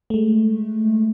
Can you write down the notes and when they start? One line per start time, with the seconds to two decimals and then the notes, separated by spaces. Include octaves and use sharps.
0.10 G#3 A3